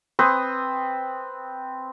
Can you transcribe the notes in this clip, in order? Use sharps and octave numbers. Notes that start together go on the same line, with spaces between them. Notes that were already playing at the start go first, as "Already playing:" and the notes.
C4 B4 D#6